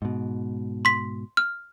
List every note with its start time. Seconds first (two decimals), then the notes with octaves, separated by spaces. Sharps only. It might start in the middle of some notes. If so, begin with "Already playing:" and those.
0.02 G#2 B2
0.85 C6 B6
1.37 F6